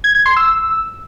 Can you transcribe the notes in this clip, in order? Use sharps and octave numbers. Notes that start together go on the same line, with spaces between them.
G#6
G#6
C6
E6